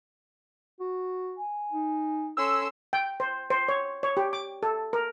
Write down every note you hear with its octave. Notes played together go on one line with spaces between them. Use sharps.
F#4
G#5
D#4
C#4 A4 C6 E6
G5
C5
C5
C#5
C#5
G4
D6
A4
A#4